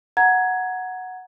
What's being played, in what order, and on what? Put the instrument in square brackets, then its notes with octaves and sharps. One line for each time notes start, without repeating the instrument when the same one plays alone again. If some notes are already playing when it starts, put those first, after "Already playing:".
[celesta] F#5 A#5 G#6